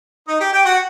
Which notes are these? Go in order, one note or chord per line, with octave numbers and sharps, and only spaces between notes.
D#4 D#5
G4 G5
G4 G5
F#4 F#5